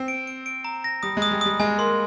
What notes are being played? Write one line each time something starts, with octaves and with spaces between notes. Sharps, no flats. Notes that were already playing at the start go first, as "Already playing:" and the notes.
Already playing: C4
D7
D7
D7
A#5
A#6
G3 D#6
G#3
D#6
G3
G3 D#6
G#3 G#5
A#3 C6